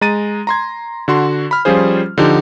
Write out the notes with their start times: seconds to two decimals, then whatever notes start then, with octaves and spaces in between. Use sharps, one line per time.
0.01 G#3 A#5 A6 D#7
0.47 A#5 C6 G#6
1.08 D3 F#4 C6
1.51 B5 F6
1.65 F3 G3 C#4 F4 G#4 C5
2.18 D3 F3 D#4 G4